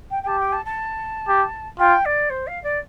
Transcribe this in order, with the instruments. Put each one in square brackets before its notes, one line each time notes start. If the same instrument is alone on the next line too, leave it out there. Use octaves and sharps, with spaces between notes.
[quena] G5
G5
[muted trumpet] G4 [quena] A5
[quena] G5
A5
A5
[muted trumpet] G4
[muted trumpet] F4 [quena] G5
[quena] D5
C5
F5
D5